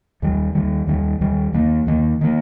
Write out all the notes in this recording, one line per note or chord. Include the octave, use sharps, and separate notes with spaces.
D#2 D#3 G3
D#2 D#3 G3
D#2 D#3 G3
D#2 D#3 G3
D#2 D#3 A#3
D#2 D#3 A#3
D#3 A#3